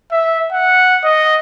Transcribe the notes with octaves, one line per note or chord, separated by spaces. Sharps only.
E5
F#5
D#5